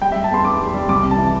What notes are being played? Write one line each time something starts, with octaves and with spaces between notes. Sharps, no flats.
G3 G5
E5
G3
A5
E2 C6
E2 D6
G3
G3
C2 D6
C3
A5
E3